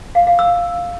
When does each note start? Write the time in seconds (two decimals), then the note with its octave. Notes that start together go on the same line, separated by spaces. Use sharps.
0.15 F5
0.27 F5
0.39 E6